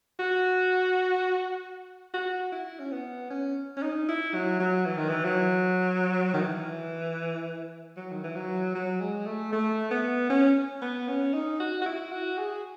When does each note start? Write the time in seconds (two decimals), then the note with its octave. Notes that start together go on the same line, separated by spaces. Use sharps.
0.19 F#4
2.14 F#4
2.52 E4
2.79 C#4
2.92 B3
3.30 C#4
3.77 C#4
3.82 D#4
4.08 E4
4.34 F#3
4.60 F#3
4.86 E3
4.97 D#3
5.09 E3
5.25 F#3
6.34 D#3
6.41 E3
7.97 F#3
8.12 D#3
8.24 E3
8.36 F#3
8.75 F#3
9.00 G#3
9.26 A3
9.53 A3
9.91 B3
10.30 C#4
10.82 B3
11.08 C#4
11.34 D#4
11.60 F#4
11.82 F#4
11.86 E4
12.12 F#4
12.38 G#4